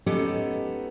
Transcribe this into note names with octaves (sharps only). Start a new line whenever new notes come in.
G#3 B3 C#4 D#4 G4 A4